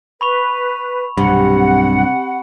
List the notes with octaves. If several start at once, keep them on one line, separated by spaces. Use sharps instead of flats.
B4 B5 C#6 F7
B1 G2 C3 F#5 B5